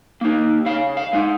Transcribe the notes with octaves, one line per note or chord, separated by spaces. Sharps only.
A#3 D#4
C#3 F5
F5
G#3 D#4